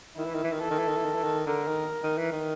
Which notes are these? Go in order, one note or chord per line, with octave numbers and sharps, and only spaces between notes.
D#3 E4
E3
D#3
E3
D#3
E3 A4
D#3
E3
D#3
E3
D#3
E3
D#3
D3 A#4
D#3
D#3
E3
D#3